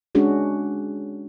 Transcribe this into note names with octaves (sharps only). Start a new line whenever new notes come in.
G#3 C#4 D4 F#4 G#4